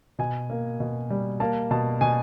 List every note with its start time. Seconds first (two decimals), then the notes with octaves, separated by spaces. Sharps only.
0.19 B2 G#5
0.50 A#3
0.80 B2
1.10 G3
1.40 A#3 A5
1.71 B2 A5
2.01 B2 G#5